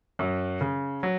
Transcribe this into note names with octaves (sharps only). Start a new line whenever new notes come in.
F#2 F#3
C#3
F#3